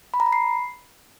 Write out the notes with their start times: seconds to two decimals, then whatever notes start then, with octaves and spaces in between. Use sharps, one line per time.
0.14 B5
0.20 A#5
0.26 B5
0.33 C7